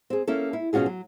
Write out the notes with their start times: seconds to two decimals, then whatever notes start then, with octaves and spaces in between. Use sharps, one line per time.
0.10 C4 G#4
0.27 A#3 C#4 E4 A4
0.53 E4
0.73 B2 C#4 F4 F#4 G#4
0.86 F#3